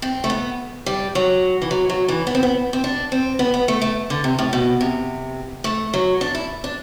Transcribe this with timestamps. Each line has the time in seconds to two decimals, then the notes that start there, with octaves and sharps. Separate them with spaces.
0.02 C4
0.24 A3
0.30 B3
0.86 G3
1.15 F#3
1.62 E3
1.71 F#3
1.90 F#3
2.08 E3
2.27 B3
2.35 C4
2.43 B3
2.73 C4
2.84 D4
3.12 C4
3.39 B3
3.54 B3
3.68 A3
3.82 A3
4.10 D3
4.24 C3
4.39 A2
4.53 B2
4.81 C3
5.64 A3
5.94 F#3
6.21 D4
6.35 E4
6.64 D4